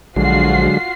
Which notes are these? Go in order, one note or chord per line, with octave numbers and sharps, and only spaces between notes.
A#1 D3 F#3 G#3 F4 F#4 C7